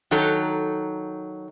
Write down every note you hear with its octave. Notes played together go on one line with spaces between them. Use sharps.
D#3 F#3 D#4 A4